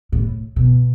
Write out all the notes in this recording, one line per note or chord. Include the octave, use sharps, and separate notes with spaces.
A2
B2